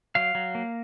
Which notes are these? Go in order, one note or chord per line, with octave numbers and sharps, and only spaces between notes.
F#3 F5
F#3
A#3